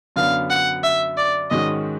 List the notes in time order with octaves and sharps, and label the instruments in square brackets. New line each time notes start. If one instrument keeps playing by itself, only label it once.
[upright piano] F#2 D3 F#3 B3 D4 [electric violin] F5
[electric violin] F#5
E5
D5
[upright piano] G#2 D#3 G#3 C#4 F#4 [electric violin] D#5